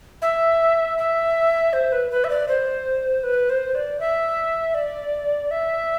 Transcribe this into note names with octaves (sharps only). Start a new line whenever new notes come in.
E5
E5
C5
B4
B4
E5
D5
C5
B4
C5
D5
E5
D5
E5